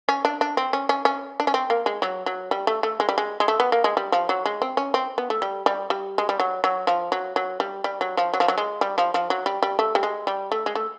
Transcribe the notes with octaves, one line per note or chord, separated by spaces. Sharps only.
C#4
D4
D4
C4
C#4
C#4
C#4
D4
C#4
C4
A#3
G#3
F#3
F#3
G3
A3
A3
G#3
G3
G#3
G#3
A3
B3
A#3
G#3
G3
F3
F#3
G#3
C4
C#4
C4
B3
A3
G3
G3
G3
G#3
G3
F#3
F#3
F3
F#3
F#3
G3
G3
F#3
F3
F#3
F3
F#3
G#3
G3
F3
F3
F#3
G3
G3
A3
G3
G#3
G3
A3
G#3
A3